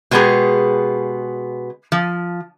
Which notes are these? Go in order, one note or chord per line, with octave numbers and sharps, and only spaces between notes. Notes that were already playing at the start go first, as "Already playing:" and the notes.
B2 G#3 B3 G4 G#4 A#5
F3